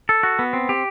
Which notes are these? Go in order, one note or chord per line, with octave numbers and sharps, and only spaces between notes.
A4
F#4
B3
C4
G4